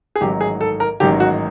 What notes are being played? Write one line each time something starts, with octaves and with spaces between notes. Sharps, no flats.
G#4
A1 G#2 D#3 F#3 G4
G#4
A4
A#4
A1 G#2 D#3 F#3 G4
F#4